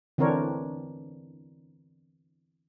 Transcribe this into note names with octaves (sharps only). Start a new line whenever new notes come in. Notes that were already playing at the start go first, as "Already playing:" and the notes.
D3 E3 C4 D4 A#4 C#5